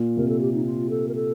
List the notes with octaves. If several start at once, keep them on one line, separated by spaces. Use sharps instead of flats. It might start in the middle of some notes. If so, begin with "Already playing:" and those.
Already playing: A#2
C3 A#4
A4
G4
D#4
F4
A4
A#4
A4